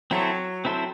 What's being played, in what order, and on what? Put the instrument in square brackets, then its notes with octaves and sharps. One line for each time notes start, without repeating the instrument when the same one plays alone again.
[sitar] F#3 [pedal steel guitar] C4 E4 A4 C5
[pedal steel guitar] C4 E4 A4 C5